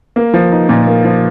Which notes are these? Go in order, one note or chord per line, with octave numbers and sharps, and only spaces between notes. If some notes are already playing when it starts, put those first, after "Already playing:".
A#3
F3
D#4
A#2
A#3
F3